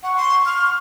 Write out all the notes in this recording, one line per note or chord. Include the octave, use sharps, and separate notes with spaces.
F#5 C#6
C6
F6